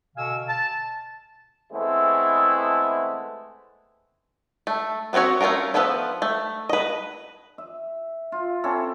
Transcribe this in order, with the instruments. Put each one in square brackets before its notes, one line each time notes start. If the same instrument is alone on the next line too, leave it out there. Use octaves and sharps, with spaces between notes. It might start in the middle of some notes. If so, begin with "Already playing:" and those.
[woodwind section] B2 D3 F5 G#5 E6
A5
[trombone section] E3 G#3 A3 B3 C4 E4
[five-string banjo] A3
B3 C4 F4 F#4 C#5
A3 C#4 E4 F4 A#4
F3 B3 A4 B4 E5
A3
B4 D#5
[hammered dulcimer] E5
F4
C4 C#4 E4 A4